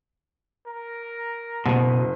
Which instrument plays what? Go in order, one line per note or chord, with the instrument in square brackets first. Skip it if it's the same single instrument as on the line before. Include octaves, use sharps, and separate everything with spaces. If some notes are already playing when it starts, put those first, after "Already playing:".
[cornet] A#4
[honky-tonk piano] F#1 [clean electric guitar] B2